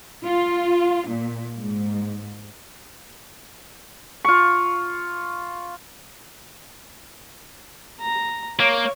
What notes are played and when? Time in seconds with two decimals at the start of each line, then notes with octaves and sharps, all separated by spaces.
0.24 F4
1.09 A#2
1.59 G#2
4.25 F4 C#6
8.01 A#5
8.60 A#3 C#5